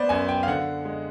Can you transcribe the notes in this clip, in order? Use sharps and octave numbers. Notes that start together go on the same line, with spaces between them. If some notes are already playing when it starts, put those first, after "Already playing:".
Already playing: B3 C5 D5
F#2 G#5
G5
F5
D3 F#5
G#3